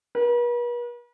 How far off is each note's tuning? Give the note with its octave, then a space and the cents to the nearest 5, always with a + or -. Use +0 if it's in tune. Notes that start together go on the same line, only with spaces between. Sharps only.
B4 -45